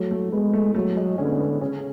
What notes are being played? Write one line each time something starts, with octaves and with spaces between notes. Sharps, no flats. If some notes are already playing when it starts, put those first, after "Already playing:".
Already playing: F#3 A3
A3
G#3 B3
A3
F#3 A3
G#3
D3 C#4
B3
C#4
B3
C#3 C#4